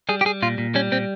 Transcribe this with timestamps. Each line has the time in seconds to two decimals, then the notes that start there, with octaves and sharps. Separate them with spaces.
0.09 G3 G#4
0.21 G4
0.25 G3 G#4
0.42 A#2 F4
0.58 A#2
0.75 G3 C#4
0.92 A#2 C4